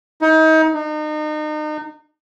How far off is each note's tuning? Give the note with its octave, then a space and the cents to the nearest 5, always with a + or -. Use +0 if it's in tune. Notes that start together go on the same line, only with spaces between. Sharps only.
D#4 +35
D#4 -35